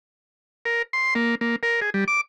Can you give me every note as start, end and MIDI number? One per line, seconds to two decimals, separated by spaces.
0.65 0.82 70
0.93 1.14 84
1.15 1.35 58
1.41 1.56 58
1.63 1.80 70
1.81 1.90 68
1.94 2.04 55
2.08 2.21 86